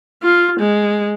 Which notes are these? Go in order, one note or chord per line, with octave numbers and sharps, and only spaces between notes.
F4
G#3